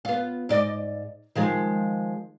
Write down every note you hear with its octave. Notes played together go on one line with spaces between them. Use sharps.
B3 F4
G#2 D5 D#5
D#3 F3 G#3